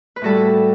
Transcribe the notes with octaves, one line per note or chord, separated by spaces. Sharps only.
B4
A2 G3 F#4 A4